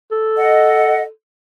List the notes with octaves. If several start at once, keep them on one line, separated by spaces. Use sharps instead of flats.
A4
D#5 F#5